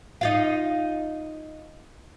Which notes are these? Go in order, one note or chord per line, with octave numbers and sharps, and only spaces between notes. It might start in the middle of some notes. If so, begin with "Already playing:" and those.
D#4 F4 F5